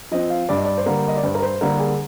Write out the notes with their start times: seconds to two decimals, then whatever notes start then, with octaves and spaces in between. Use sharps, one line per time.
0.12 F3 C4 D#5
0.30 F5
0.49 G2 D5
0.57 D#5
0.65 D5
0.77 C5
0.86 D3 G3 A#3 A#4
1.08 D#5
1.17 D5
1.23 G2 C5
1.35 A#4
1.42 C5
1.61 D3 G3 A#3 A#4
1.80 G#4